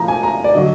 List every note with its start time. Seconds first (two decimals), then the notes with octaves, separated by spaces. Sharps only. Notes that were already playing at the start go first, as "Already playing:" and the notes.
Already playing: A2 F3 A#5
0.08 G#5
0.23 A#5
0.44 D5
0.54 D3 F#3 D#5